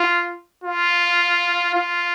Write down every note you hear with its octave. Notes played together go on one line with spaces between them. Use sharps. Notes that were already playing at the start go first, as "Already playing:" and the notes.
Already playing: F4
F4
F4